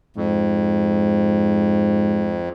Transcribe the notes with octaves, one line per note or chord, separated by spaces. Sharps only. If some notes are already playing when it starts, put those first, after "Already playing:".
F2 G#2